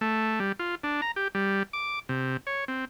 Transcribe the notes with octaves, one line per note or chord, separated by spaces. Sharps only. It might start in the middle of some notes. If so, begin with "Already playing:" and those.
A3
G3
F4
D4
A#5
G4
G3
D6
C3
C#5
C4